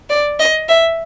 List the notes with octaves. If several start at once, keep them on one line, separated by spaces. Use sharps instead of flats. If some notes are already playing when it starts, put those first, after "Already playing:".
D5
D#5
E5